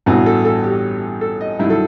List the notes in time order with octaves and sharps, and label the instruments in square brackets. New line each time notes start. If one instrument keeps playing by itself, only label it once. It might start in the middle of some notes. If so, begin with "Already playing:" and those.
[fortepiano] A1 G2 E3 B3 F#4
A4
A4
G4
A4
D#5
G2 D#3 F#3 E4
A4